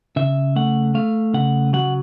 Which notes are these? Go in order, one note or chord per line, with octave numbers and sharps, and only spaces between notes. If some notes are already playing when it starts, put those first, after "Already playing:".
C#3 E5
A3 F#5
A3 F5
C#3 F#5
F#3 F#5